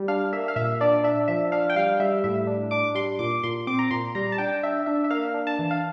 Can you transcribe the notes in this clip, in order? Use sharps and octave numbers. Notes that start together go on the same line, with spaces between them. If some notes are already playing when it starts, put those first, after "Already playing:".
Already playing: G3
D4 F5
A#3 E5
F5
A#2 E5
D4 D5
D4 E5
F3 E5
D4 F5
G5
G3 F5
G3 E5
A2 E5
D4
D4 D6
G3 C6
A#2 D6
A#2 C6
C4 D6
A#5
A#2 C6
G3 A#5
A5
D4 G5
D4 E5
D4 E5
E5
A#3 F5
D4
A5
E3
F5